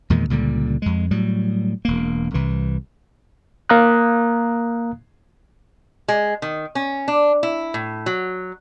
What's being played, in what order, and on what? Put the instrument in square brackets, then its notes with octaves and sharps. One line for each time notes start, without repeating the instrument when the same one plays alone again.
[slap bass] E2 A#2 D#3 G#3
C#2 A#2 D3 G3
F2 G#3
A2 F#3 G3
E1 A#3
C2 E3
[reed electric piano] A#3 F5 A#5 D#6 F#6
[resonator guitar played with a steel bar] G#3
D#3
C#4
D4
E4
A2
F#3